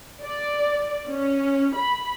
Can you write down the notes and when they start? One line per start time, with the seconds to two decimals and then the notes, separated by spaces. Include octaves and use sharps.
0.24 D5
1.11 C#4
1.78 B5